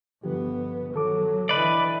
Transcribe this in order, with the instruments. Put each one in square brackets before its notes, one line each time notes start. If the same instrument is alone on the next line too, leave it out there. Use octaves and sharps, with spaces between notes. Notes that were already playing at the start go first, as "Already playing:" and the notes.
[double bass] G1 B3 [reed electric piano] D3 F3 G4
[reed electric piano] D#3 A4 D6 [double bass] F#3
[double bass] D3 E3 [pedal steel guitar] B4 D5 [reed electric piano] D#5